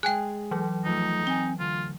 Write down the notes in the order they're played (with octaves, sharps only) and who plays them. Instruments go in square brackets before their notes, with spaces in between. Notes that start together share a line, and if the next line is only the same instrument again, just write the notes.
[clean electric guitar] G#3 G#4 [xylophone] G5 G#5 F#6
[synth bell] E3 F#3
[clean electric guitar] E2 F3 A3 [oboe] D#4
[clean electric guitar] C4 G#5 [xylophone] G7
[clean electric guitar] D2 [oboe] F4